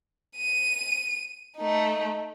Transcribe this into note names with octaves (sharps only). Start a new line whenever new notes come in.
D#7
A3 D#4